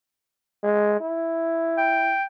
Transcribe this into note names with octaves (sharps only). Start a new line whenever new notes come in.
G#3
E4
G5